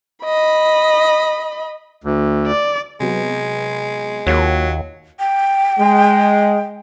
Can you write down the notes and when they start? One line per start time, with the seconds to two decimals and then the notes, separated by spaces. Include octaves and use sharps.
0.25 D#5 B5
2.04 D2
2.47 D5
3.00 C3 F#3 G#3 B3
4.27 D#2 F#3 A#3 F4
5.19 G5
5.79 G#3